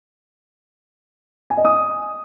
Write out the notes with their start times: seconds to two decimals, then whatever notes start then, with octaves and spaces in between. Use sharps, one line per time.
1.50 G#5
1.57 D#5
1.65 D#6